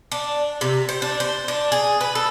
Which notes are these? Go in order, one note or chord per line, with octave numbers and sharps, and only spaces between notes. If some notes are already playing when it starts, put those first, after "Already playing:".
D4
C3
C5
D4
C5
D4
G#4
B4
A4